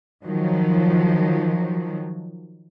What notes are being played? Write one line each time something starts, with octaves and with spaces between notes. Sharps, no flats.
D#3 F3 F#3